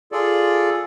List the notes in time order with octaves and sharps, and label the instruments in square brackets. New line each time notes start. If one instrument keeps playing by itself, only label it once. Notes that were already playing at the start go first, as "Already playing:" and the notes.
[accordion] F4 G#4 A4 D5